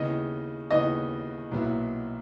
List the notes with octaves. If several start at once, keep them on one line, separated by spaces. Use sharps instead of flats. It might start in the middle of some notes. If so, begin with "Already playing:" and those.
Already playing: D#2 C#3 E3 B3 D#4 D#5
D#2 C#3 E3 B3 D#4 D#5
B1 A#2 F#3 B3 E4